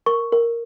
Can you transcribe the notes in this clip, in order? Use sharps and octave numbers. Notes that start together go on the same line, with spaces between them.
A#4 C#6
A#4